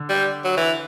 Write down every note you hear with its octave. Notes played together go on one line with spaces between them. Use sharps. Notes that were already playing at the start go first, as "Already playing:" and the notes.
Already playing: D3
G3
F#3
E3